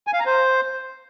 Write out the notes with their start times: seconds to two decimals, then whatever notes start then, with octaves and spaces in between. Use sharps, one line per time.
0.07 G#5
0.13 F5
0.20 A#5
0.26 C5